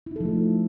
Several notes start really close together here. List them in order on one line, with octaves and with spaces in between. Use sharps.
E4 D#4 A4 F3 A3